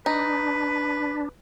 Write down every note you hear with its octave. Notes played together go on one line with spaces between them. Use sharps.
D4 D#4 B4